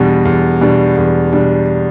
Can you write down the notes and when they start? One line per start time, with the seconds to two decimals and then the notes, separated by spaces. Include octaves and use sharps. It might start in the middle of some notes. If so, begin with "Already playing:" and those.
Already playing: E2 B2 G3 D4
0.25 E2
0.61 B2 G3 D4
0.97 E2
1.33 B2 G3 D4